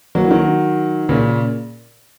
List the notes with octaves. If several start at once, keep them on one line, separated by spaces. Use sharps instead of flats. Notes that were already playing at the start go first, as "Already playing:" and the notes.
F#3 A#3
E3
D#3 F#3
A#2 C#3